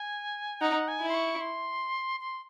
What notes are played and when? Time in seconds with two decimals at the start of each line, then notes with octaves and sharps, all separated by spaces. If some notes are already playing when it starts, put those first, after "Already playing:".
Already playing: G#5
0.61 D#4 F#5
0.88 G#5
1.00 E4
1.09 C6
1.14 C#6
1.40 C6
2.20 C6